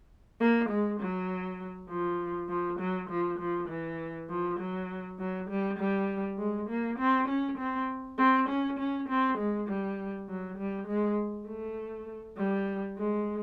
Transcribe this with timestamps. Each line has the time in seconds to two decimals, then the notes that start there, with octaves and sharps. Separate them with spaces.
0.40 A#3
0.69 G#3
1.00 F#3
1.89 F3
2.49 F3
2.80 F#3
3.10 F3
3.39 F3
3.69 E3
4.30 F3
4.59 F#3
5.19 F#3
5.50 G3
5.79 G3
6.38 G#3
6.69 A#3
6.99 C4
7.28 C#4
7.58 C4
8.18 C4
8.49 C#4
8.79 C#4
9.09 C4
9.38 G#3
9.68 G3
10.29 F#3
10.58 G3
10.87 G#3
11.48 A3
12.37 G3
12.97 G#3